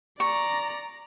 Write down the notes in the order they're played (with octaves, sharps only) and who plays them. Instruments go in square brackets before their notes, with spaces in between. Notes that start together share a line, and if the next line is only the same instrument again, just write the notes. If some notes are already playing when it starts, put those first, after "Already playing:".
[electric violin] D5 A#5 [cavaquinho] C#6